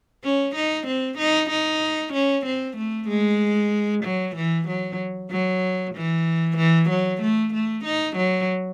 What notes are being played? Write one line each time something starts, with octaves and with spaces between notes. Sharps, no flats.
C#4
D#4
C4
D#4
D#4
C#4
C4
A3
G#3
F#3
E3
F#3
F#3
E3
E3
F#3
A3
A3
D#4
F#3